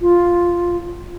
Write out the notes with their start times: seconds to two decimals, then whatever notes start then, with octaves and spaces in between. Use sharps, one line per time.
0.01 F4